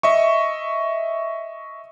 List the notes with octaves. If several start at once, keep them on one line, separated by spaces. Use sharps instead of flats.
D#5 E5 C#6